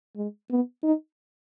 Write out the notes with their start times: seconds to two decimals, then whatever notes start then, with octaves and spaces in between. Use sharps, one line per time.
0.16 G#3
0.51 B3
0.84 D#4